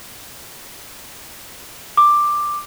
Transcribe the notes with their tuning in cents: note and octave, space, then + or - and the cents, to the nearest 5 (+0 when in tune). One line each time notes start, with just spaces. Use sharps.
D6 +10